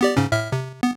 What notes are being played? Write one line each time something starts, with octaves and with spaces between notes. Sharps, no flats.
B3 G4 D5
G#2 C#3 C#4
A2 E5 F6
C3
B3